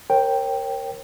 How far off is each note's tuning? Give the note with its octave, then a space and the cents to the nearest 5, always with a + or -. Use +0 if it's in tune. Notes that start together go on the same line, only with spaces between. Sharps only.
A#4 +0 C#5 -40 G5 +0